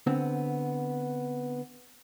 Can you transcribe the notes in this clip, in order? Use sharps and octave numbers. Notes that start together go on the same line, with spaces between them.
D3 B3 C4